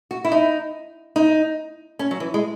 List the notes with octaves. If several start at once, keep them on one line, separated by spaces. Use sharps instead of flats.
F#4
E4
D#4
D#4
C#4
F#3
E3
G#3